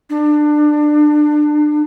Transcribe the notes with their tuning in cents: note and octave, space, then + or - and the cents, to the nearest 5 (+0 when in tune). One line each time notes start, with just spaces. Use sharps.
D4 +25